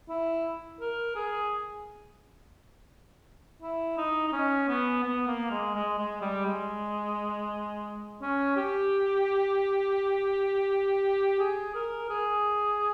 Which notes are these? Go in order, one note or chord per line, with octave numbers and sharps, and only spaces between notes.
E4
A#4
G#4
E4
D#4
D#4
C#4
B3
B3
A#3
G#3
G#3
G#3
G3
G#3
C#4
G4
G#4
A#4
G#4